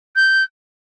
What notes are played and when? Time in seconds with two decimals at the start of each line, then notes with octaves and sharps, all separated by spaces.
0.16 G6